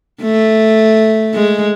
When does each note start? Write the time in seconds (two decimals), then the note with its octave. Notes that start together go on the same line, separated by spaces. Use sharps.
0.22 A3
1.34 G#3